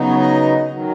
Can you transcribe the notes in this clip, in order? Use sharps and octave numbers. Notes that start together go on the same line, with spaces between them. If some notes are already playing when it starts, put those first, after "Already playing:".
Already playing: C#3 F#3 B3 D#4
C#5
D#5
D#3 F#3